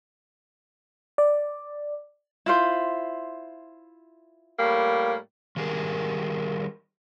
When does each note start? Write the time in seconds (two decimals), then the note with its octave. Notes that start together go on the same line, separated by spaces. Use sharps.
1.18 D5
2.46 E4 F4 C5
4.58 A2 G3 A#3
5.56 D#3 G3 G#4 A#4